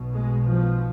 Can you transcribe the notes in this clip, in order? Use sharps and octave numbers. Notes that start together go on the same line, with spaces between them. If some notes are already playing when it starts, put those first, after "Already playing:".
Already playing: B1 B2
G#3
F3